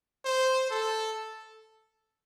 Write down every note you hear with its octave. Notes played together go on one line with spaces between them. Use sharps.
C5
A4